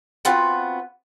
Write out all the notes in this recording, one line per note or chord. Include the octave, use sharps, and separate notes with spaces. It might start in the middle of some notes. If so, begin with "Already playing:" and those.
B3 C4 F4 F#4 B4